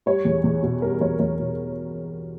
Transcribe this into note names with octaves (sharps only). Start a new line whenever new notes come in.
G3 C#5
E2
E2
B2
G3 A#4
E2 C#5
E2 C#5
B2